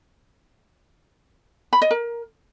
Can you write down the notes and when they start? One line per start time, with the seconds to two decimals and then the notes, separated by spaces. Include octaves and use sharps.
1.73 B5
1.82 D#5
1.91 A#4